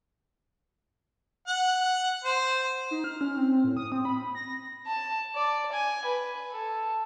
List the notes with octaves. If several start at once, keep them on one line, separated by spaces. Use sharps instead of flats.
F#5
C5
D#4
F6
C#4
C4
A2
D#6
C4
B5
A#6
A5
D5
G#5
B4
A4